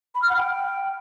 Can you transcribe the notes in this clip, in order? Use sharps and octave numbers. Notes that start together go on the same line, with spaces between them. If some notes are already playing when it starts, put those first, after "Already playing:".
B5
F6
F#5
G5